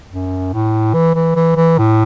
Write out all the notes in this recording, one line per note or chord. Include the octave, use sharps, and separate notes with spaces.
F#2
A2
E3
E3
E3
E3
A2